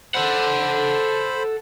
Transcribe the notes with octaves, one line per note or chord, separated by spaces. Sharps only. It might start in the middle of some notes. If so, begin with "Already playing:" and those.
A4 C5 F#5 B5